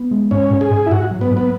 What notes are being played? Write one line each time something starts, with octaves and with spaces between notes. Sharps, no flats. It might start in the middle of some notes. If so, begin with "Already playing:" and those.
Already playing: B3
G#3
G#2 C#4
G#2
G#4
G#2
E4
G#2 F#4
F#3
B3
G#2
B3